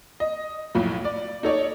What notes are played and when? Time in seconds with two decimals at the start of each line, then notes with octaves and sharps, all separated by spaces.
0.20 D#5
0.75 B1 A2 F3
1.04 D5
1.43 D#4 A4 C#5 D5